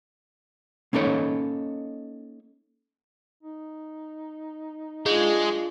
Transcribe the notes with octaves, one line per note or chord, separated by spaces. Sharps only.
A#3 C#4 D#4 A4 C#5
D#4
G#3 D4 F4 G#4